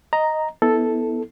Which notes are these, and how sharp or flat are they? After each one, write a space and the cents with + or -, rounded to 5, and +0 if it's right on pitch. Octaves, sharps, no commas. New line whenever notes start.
D#5 +0 A#5 +0
B3 +0 E4 -30 A4 +0